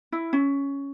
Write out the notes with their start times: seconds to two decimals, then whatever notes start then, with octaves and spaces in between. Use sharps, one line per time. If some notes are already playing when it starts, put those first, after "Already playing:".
0.12 E4
0.33 C#4